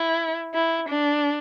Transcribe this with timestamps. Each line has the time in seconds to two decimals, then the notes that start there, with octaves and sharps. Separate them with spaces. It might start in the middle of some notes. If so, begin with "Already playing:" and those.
Already playing: E4
0.54 E4
0.90 D4